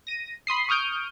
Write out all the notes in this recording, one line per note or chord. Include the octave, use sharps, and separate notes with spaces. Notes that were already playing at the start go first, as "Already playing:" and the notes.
A#6 D#7
B5 C6 D#6 C7
C#6 D#6 F6 G6 D7